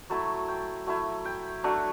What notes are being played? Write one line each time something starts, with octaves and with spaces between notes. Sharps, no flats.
F#3 A3 E4 A5
G5
F#3 A3 E4
G5
F#3 A3 D4